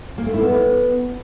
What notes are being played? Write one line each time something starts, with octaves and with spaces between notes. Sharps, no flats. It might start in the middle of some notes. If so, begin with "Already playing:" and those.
A#3
A3
E4
B3